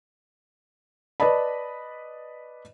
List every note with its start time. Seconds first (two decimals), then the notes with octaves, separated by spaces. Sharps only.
1.20 B4 D5 D#5 A5 B5